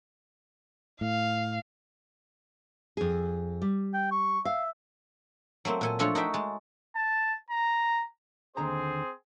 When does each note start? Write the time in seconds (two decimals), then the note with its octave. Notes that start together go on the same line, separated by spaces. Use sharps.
1.01 A2 F5
2.97 F2 G#4
3.62 G3
3.94 G5
4.11 C#6
4.45 E5 F5
5.65 F#3 A3 A#3 C4
5.81 A#2 A4 G#5
5.99 F3 A3 D4 F4 A4 C#5
6.15 D#4 F#4 E5 G5
6.34 G#3 A5
6.96 A5
7.50 A#5
8.57 D#2 D3 C4 G#4 C5 A#5